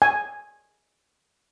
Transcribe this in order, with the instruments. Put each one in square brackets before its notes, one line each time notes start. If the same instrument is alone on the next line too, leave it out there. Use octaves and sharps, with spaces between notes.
[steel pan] G#5